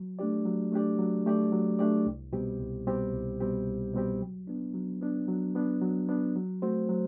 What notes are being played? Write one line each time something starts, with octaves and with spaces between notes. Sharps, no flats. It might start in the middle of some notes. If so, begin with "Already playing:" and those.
Already playing: F#3
A3 D4 G4 D5
F#3
A3 D4 G4 D5
F#3
A3 D4 G4 D5
F#3
A3 D4 G4 D5
C2
B2 G3 C4 G4
C2
B2 G3 C4 G4
C2
B2 G3 C4 G4
C2
B2 G3 C4 G4
F#3
B3 D4
F#3
B3 D4
F#3
B3 D4
F#3
B3 D4
F#3
A3 C4 F#4 C5
F#3